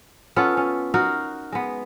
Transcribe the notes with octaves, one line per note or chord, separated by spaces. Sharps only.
B3 C#4 F4 A4
C#4
D#4 F#4 A#4 F5
G#3 B3